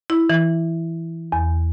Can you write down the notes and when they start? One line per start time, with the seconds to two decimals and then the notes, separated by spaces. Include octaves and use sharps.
0.10 E4
0.29 E3
1.32 E2